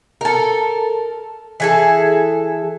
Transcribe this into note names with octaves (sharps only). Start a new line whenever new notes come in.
A4 A#4
E3 G#4 A4